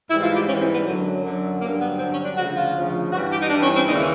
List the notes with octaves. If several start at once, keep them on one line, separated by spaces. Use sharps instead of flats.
G#2 E3 G3 E4
F4
G4
G#2 E3 G3 C#4
C4
B3
F#2 D3 F#3
F#2 D3 F#3
G2 D3 F#3 A#3
B3
G2 D3 F#3 C4
C#4
D4
D2 C#3 F3 F#4
F4
D2 C#3 F3
G2 E3 G3 F#4
G4
D#4
G2 E3 G3 D4
C#4
C4
D#2 C#3 E3 G3 D#4